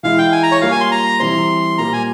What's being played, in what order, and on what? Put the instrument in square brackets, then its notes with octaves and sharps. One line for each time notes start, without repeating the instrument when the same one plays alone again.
[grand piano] E3 G#3 E4 [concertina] F5
[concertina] G5
G#5
A#5
C#5
[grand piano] G3 A#3 F4 [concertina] F5
[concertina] G#5
C6
A#5
[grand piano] E3 G3 C4 [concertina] C6
[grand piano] A#2 G3 A#3 F4 [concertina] A#5
[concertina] G#5